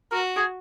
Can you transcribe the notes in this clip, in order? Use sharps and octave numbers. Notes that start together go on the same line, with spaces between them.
F#4 A#4
G#4